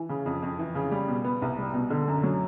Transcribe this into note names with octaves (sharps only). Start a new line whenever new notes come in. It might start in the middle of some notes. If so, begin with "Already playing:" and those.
Already playing: E3
C#3
F2
F2
E3
C#3
G3
B2
B3
C2
G3
B2
D3
F#2
F#3